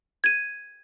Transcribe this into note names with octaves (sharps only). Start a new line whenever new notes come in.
G#6 D#7